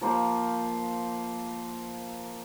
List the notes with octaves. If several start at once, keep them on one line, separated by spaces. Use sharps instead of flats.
F3 A#3 C5